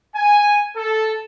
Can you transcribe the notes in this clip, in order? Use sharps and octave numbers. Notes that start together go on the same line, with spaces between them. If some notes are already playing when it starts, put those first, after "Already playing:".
G#5
A4